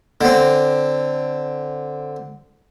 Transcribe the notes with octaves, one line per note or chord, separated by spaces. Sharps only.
D3 C4